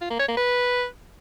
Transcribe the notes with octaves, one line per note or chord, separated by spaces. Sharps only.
F4
A#3
C#5
A#3
B4